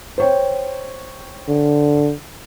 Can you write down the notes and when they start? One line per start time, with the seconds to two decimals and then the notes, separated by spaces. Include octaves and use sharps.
0.18 C5 C#5 G5
1.48 D3